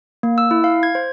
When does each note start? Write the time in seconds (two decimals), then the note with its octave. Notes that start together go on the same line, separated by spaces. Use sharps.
0.23 A#3
0.38 E6
0.51 E4
0.64 F5
0.83 G#6
0.95 C5